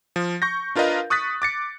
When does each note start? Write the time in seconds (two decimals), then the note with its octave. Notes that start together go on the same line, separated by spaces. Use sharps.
0.16 F3
0.42 C#6 G6 A#6
0.75 D4 F4 A#4 B4 D#5 F5
1.10 C#6 D#6 F#6 A6 B6
1.42 D6 A6 C#7